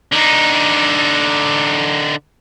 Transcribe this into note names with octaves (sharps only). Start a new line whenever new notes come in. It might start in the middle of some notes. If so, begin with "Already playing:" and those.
D3 D#4